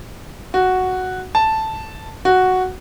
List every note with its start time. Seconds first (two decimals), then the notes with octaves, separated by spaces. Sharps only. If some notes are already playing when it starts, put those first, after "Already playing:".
0.54 F#4
1.35 A5
2.25 F#4